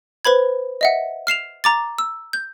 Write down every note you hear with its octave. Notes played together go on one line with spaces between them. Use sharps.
B4 C5 B5 G#6
D#5 E5 F#5
F6 C7 E7 F7
A#5 D6 A6
E6
G6